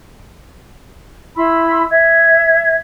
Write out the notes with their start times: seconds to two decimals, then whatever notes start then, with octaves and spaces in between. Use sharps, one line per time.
1.36 E4 B5 C6 E6
1.91 E5 G#6